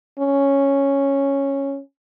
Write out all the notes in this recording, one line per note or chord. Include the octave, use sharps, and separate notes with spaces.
C#4